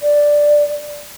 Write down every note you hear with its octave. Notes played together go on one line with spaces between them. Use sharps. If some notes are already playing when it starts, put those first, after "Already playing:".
D5